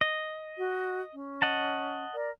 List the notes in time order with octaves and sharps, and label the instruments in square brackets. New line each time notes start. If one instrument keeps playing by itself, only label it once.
[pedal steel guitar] D#5
[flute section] F#4
C#4
[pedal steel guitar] D#5 F#5 A5
[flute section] A#4 D5